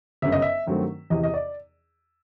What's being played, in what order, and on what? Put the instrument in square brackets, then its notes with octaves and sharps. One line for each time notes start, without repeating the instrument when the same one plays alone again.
[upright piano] G1 F#2 C#3 E5
D#5
E5
G2 D#3 F#3 A3 C4
E2 C3 E3 D#5
D#5
D5